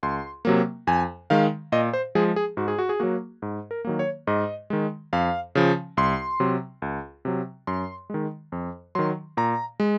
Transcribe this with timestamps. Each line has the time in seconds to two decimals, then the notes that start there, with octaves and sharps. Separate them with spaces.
0.03 C#2 C6
0.45 C3 F#3 A#3
0.87 F2 G#5
1.30 D#3 G#3 F5
1.72 A#2 D#5
1.93 C5
2.15 F3 G#3 G#4
2.36 G#4
2.57 G#2 F#4
2.68 G#4
2.79 F#4
2.89 G#4
3.00 F#3 A#3 F#4
3.42 G#2
3.71 A#4
3.85 D#3 F#3 A#3
3.99 C#5
4.27 G#2 D#5
4.70 D#3 G#3
5.13 F2 F5
5.55 C#3 F3
5.97 C2 C6
6.40 C3 F#3
6.82 C#2
7.25 C3 F#3
7.67 F#2 C6
8.10 D#3 G#3
8.52 F2
8.95 D#3 F#3 C6
9.37 A#2 A#5
9.80 G#3